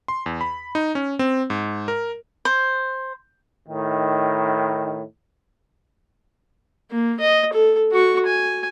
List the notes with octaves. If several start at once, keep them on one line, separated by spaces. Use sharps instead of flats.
C6
E2
B5
D#4
C#4
C4
G#2
A#4
C5
A2 D#3
A#3
D#5
A4
F#4 C#6
G#5